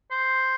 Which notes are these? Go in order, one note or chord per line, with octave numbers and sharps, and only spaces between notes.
C5